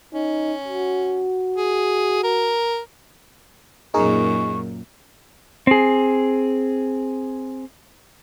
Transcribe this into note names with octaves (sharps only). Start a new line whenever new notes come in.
C#4 D#4
F#4
G#4
A#4
F#2 A#2 D#4 G#4 A#4 C#6
C4 G#4